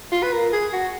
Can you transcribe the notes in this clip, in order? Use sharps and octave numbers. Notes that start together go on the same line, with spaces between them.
F4
B4
A#4
G#4
F#4